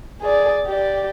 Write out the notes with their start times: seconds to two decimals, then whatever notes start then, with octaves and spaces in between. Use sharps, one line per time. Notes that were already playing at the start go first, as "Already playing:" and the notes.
0.22 G#4 D5
0.67 G4 D5